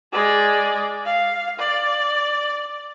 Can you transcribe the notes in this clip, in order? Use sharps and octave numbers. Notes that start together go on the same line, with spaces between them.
G#3 D5
F5
D5